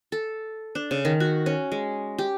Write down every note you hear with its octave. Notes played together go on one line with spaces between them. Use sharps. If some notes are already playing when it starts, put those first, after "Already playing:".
A4
D4
C#3
D#3
F#4
C#4
G#3
G4